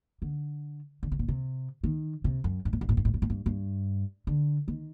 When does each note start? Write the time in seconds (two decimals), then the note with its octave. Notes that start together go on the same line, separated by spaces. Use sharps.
0.22 D3
1.03 D3
1.12 C3
1.19 A#2
1.28 C3
1.84 D#3
2.24 C3
2.44 F#2
2.65 G2
2.73 A2
2.81 G2
2.89 A2
2.97 G2
3.05 A2
3.14 G2
3.22 A2
3.30 G2
3.46 G2
4.27 D3
4.68 D#3